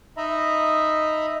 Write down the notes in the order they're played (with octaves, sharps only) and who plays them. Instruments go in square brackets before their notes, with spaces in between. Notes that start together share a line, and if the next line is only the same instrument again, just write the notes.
[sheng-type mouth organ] D#4 D#5 E5 A#5 B5